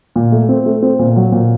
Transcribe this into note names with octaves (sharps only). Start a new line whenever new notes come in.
A#2
A3
C4
A3
C4
A#2
F#3
A#2